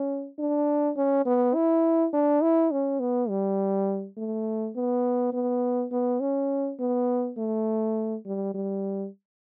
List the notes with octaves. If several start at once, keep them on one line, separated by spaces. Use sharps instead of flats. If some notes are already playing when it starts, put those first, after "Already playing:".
Already playing: C#4
D4
C#4
B3
E4
D4
E4
C#4
B3
G3
A3
B3
B3
B3
C#4
B3
A3
G3
G3